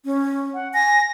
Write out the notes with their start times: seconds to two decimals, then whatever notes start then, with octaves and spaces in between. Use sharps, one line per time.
0.05 C#4
0.54 F#5
0.74 G#5 A#6